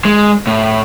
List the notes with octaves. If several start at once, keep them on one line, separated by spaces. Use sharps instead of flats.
G#3
A2